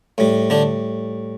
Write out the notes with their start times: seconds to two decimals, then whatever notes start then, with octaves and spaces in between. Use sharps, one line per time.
0.18 A2 G3
0.50 D3 D4